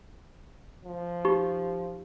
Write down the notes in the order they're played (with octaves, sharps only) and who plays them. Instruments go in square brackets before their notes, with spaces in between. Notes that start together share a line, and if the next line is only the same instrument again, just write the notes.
[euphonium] F3
[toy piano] D#4 G4 C#6